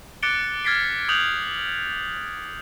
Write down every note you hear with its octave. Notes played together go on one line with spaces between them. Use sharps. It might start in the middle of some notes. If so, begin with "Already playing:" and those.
D6 F#6 A6 C#7 D7 G7
F6 G#6 A6 B6 C7 D7
D#6 F#6 G6 F7 F#7